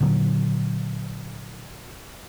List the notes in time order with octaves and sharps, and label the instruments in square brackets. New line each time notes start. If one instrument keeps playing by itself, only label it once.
[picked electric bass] A#2 D3 F#3